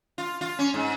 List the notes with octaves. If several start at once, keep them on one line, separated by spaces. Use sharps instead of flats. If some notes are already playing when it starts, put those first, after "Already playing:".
F4
F4
C#4
G#2